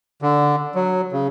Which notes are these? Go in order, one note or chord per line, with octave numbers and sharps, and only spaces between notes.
D3
F#3
C#3